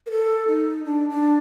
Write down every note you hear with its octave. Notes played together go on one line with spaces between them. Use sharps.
A#4
A4
D#4
D4
D4